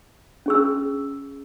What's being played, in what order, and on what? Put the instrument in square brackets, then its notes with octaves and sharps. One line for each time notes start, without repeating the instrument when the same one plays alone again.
[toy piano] C#4 G#4 E6